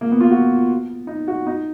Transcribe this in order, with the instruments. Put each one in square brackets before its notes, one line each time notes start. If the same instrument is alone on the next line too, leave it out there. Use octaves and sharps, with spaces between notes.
[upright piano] A#3
B3
F4
F#4
D#4
F#4
D#4